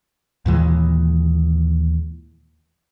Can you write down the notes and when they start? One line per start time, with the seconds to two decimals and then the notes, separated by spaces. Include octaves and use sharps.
0.46 D#2 A#2 E3 G#3